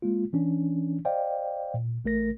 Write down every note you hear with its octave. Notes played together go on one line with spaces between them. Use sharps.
G#3 A#3 F4
E3 C#4 D4
C5 D5 D#5 F5 G5
A#2
A1 A3 A#4 A#6